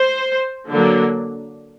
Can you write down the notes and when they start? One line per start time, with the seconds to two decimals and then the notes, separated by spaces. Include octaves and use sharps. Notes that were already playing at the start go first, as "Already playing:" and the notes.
Already playing: C5
0.70 D3 F#3 A#3 D4